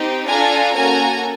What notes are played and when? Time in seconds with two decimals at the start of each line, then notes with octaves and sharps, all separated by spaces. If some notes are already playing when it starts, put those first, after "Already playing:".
Already playing: C4 D#4 G4
0.28 D4 F4 A4 G#5 A#5
0.75 A#3 C#4 F#4 A4 G#5 A#5